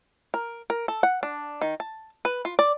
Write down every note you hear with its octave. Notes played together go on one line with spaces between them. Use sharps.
A#4
A#4
A4
F#5
D4
D#3
A5
B4
F4
D5